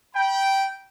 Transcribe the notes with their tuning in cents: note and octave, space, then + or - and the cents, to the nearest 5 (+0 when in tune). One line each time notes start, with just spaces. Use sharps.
G5 -10 B5 -30